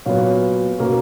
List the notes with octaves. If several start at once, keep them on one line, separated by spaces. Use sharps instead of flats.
A#2 F#3 B3 C#5 F5
B2 A#3 C#4